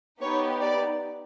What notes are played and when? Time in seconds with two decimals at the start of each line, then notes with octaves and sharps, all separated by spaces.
0.21 B3 D#4 G4 C#5
0.61 D5